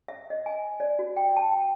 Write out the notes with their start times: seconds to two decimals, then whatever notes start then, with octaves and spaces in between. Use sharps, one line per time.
0.08 E5
0.30 D#5
0.46 G#5
0.80 D5
0.99 F#4
1.16 G5
1.36 A5
1.52 G5